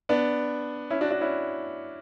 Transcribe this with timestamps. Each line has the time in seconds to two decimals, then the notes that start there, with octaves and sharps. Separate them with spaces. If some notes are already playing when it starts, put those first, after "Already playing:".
0.09 B3 D4
0.90 C#4 E4
1.01 D4 F#4
1.11 D4 F#4
1.21 C#4 E4